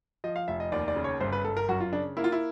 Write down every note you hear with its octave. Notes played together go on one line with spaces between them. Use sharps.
F3 D#5
F5
F1 E5
D#5
D#2 D5
D5
C#3
C#5
G1 C5
B4
G1 A4
A#4
F#2 F#4
F4
C#3 D4
A#3 E4
F4
E4